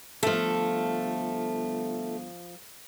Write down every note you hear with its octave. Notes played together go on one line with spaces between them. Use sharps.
G1 F3 A3 A4